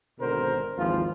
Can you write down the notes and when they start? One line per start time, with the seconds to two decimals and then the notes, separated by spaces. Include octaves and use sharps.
0.19 G#1 B2 D3 A#4 C5
0.77 G#1 D#2 E3 F3 F4